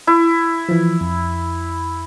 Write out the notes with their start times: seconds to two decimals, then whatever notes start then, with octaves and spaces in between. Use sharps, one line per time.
0.07 E4
0.69 E3 F3
1.01 F2